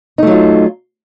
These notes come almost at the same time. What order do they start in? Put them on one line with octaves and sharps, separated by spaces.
D#4 A3 F#3 F4